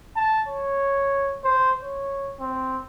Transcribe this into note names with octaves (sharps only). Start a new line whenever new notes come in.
A5
C#5
C5
C#5
C4